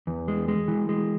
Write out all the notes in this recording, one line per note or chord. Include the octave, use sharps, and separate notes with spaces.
E2
G#3
G#3
E3
G#3